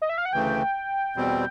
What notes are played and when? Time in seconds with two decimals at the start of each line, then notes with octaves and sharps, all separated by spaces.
0.02 D#5
0.09 E5
0.18 F5
0.25 F#5
0.33 D2 C#3 E3 A3 G5
1.16 E2 B2 G3 C4